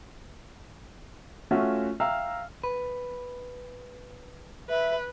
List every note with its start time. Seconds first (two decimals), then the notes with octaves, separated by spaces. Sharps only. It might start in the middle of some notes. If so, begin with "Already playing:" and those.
1.51 A3 C#4 F4 F#4 E5 F#5
2.00 E5 F5 G5 A#5 E6 F6
2.64 B4
4.69 B4 E5